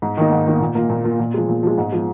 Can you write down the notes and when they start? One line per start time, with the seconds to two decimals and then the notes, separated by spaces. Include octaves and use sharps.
0.02 G#2
0.17 D#3 A#3 D#4
0.32 G#2
0.47 D#3 A#3 D#4
0.60 A#2
0.75 A#3 F4
0.90 A#2
1.04 A#3 F4
1.20 A#2
1.34 F3 G#3
1.49 A#2
1.63 F3 G#3
1.78 G#2
1.92 F3 G#3